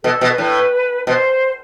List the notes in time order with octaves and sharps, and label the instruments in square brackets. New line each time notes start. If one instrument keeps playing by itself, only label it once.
[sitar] B2 [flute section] A4
[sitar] B2
[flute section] B4
[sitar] A2
[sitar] B2 [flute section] C5